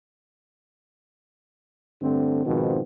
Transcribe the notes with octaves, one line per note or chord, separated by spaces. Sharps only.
G2 D3 A3 C4
G#2 B2 D#3 F3 B3 C4